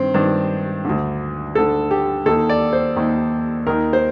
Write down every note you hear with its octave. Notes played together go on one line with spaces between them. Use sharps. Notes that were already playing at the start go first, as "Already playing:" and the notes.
Already playing: G2 D#3 C4
G2 D#3 D4
D2 D3
D2 D3 A4
G4
D#2 D#3 A4
D5
C5
D#2 D#3
D#2 D#3 A#4
C5